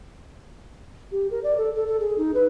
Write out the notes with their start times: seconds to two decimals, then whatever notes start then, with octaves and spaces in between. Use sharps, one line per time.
1.12 G4
1.31 A#4
1.44 D5
1.58 A4
1.76 A4
1.87 A4
2.00 G#4
2.18 D#4
2.34 B4